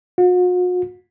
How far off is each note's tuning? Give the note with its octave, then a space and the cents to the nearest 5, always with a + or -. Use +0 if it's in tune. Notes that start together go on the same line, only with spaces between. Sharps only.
F#4 -45